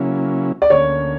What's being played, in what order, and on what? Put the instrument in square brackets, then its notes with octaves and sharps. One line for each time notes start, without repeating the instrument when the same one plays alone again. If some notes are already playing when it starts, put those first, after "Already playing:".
Already playing: [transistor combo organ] C#3 F#3 A#3 C#4 E4
[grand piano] D5
[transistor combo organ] D2 D3 A#3 C#4 [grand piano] C#5